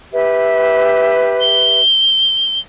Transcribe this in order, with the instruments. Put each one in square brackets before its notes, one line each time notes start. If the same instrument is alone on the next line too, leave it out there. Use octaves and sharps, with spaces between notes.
[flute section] G4 B4 E5
[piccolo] G7